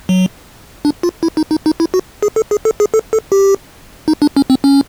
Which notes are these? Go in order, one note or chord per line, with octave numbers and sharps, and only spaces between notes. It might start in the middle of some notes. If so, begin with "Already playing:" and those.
F#3
D4
F4
E4
D#4
D#4
D#4
E4
F#4
G#4
A4
G#4
A4
G#4
A4
A4
G4
D#4
D4
C#4
C4
C#4